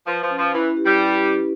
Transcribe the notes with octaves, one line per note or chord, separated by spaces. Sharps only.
F3 B4
F3
C#4
F3
E3 E4
G4
G3
B4
C#4